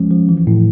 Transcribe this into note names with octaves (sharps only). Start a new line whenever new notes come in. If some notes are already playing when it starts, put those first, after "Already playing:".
Already playing: F3 G#3 C#4
F3
E3
A2